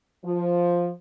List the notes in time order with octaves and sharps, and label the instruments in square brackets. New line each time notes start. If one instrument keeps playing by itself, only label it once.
[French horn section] F3